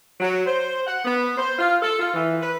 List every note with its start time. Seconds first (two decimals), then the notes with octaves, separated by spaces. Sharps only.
0.20 F#3
0.46 C5
0.87 F#5
1.05 B3
1.38 C5
1.59 F4
1.82 A4
1.99 F4
2.14 E3
2.41 B4